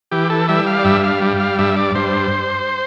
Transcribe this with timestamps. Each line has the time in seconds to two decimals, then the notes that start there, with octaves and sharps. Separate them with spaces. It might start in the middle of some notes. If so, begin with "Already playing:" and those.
0.11 E3 G4
0.30 A4
0.49 G3 E5
0.67 F5
0.79 D5
0.85 G2 E5
1.04 F5
1.22 G3
1.40 F5
1.59 G2 E5
1.76 D5
1.95 G2 C5